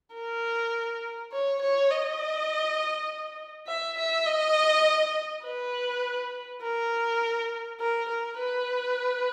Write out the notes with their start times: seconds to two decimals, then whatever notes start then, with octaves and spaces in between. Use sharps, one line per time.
0.14 A#4
1.32 C#5
1.61 C#5
1.90 D#5
3.67 E5
3.97 E5
4.26 D#5
5.44 B4
6.62 A#4
7.80 A#4
8.08 A#4
8.38 B4